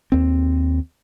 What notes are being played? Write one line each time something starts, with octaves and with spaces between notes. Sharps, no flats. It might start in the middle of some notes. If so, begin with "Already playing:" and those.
D#2 C4